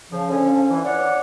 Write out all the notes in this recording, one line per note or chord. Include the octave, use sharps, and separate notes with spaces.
C#3 F3
D3 F3 C#4
E3
C#5 D5 F#5